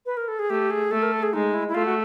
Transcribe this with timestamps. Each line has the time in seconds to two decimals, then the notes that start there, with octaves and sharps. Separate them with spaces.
0.06 B4
0.17 A#4
0.28 A4
0.39 G#4
0.50 A3 G4
0.71 G#4
0.91 A3 A4
1.02 A#4
1.12 A4
1.23 G#4
1.33 G#3 D#4
1.54 E4
1.68 E4
1.74 A3 F4
1.86 F#4